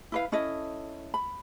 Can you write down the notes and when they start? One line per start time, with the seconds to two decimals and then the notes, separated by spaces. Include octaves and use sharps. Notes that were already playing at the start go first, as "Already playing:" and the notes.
0.12 E4 B4 F5
0.32 C#4 E4 A4 D#5
1.14 B5